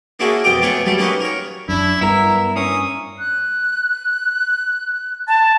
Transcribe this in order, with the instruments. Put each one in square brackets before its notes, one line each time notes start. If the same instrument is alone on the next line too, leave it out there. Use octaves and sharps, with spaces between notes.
[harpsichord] A#3 C#4 D4 E4 F#4 G#4
F2 B2 D#5 G5 A#5 D6
A3 B3 D4 C#5 F#5 G#5
F#3 G3 A3 A4
A#3 C#4 D#4 F#4 G4 B4
A#4 C#5
[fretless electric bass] F#2 [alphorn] D4 [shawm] E4
[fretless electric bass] G2 [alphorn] B3 [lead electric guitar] E4 A#4 [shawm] E5
[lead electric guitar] A#3 C#4 [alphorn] D4 [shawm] D#6
[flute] F#6
[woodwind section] A5